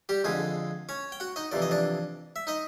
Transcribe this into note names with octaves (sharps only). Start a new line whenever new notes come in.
G3 G4
F2 D3 G#3 G#4
C#4 C#5
G5
F#4 F#5
D#4 D#5
F2 C3 E3 D5
D#5
D4 D5
E5
D#4 D#5